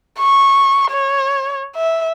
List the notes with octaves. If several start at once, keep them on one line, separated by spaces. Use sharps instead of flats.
C#6
C#5
E5